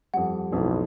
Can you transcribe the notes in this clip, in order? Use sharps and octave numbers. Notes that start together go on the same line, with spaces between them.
F2 G3 F#5
B1 F2 A2